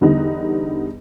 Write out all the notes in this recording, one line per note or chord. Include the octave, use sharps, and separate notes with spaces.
E2 D3 G3 B3 D#4